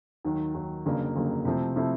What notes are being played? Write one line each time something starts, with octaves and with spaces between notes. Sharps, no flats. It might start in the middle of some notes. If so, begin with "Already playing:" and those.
D#2 D#3 F#3
D#2 D#3 F#3
G1 F2 C#3 F#3 A#3
G1 F2 C#3 F#3 A#3
C3 F3 A3 C4 E4
C3 F3 A3 C4 E4